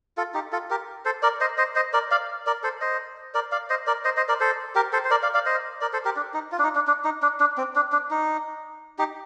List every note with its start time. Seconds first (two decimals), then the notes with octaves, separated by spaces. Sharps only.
0.17 F4 A4
0.34 D#4 G4
0.52 F4 A4
0.70 G4 A#4
1.05 A4 C5
1.22 A#4 D5
1.41 C5 D#5
1.58 C5 D#5
1.75 C5 D#5
1.93 A#4 D5
2.11 D5 F5
2.46 A#4 D5
2.63 A4 C5
2.81 C5 D#5
3.34 A#4 D5
3.52 D5 F5
3.70 C5 D#5
3.87 A#4 D5
4.05 C5 D#5
4.17 C5 D#5
4.29 A#4 D5
4.40 A4 C5
4.75 G4 A#4
4.93 A4 C5
5.05 C5
5.11 A#4 D5
5.23 D5 F5
5.34 D5 F5
5.46 C5 D#5
5.81 A#4 D5
5.93 A4 C5
6.05 G4 A#4
6.16 D4
6.34 D#4
6.52 F4
6.59 D4
6.64 D#4
6.75 D4
6.87 D4
7.05 D#4
7.22 D4
7.40 D4
7.58 C4
7.76 D4
7.92 D4
8.11 D#4
8.99 D#4 G4